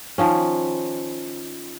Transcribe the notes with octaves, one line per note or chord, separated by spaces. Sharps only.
D#3 F3 C#4